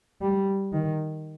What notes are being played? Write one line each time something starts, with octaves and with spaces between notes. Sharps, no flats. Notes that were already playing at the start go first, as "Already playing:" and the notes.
G3
D#3